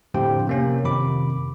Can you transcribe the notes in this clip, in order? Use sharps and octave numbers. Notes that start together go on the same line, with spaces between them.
F2 A2 D3 G4 C5 G5
C3 A#3 C#4
F2 C3 D#3 B5 D6